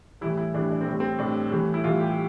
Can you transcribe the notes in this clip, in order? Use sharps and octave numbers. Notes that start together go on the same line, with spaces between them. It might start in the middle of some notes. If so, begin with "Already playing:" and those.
A2 E3 G3 E4
E4
A2 E3 G3 D4
D4
C4
A2 G3
C4
A2 G3 D4
A2 E3 G3
E4
A2 E3 G3 F4
G4